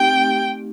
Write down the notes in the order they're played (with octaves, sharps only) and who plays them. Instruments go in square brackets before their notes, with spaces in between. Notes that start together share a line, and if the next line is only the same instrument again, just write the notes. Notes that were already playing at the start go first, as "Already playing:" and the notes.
Already playing: [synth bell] A3 C4 D#4 G4 [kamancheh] G5